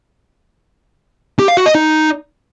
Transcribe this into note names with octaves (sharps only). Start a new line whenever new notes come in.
G4
F5
F#4
D#5
D#4